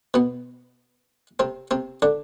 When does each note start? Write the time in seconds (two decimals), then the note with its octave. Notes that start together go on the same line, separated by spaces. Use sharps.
0.14 B2 B3
1.39 C3 C4
1.71 C3 C4
2.02 D3 D4